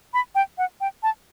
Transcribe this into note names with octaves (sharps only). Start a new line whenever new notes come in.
B5
G5
F#5
G5
A5